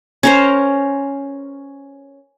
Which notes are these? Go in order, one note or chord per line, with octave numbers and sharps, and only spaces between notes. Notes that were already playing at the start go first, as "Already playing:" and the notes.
C#4 A#4 C5